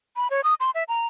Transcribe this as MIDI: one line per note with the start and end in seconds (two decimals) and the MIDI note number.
0.16 0.28 83
0.30 0.41 73
0.44 0.54 87
0.60 0.71 84
0.75 0.84 76
0.88 1.07 82